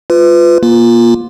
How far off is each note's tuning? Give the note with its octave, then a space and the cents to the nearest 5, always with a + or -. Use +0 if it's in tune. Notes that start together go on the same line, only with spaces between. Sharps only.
F4 +0 B4 +25
A#3 +30 F4 +0